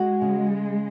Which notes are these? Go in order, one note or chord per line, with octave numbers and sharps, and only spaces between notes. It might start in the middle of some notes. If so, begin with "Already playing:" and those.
Already playing: G#3 F#4
C#3